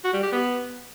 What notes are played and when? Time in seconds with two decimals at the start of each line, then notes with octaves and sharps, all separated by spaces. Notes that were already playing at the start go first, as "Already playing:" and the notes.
0.04 F#4
0.14 G3
0.23 G4
0.32 B3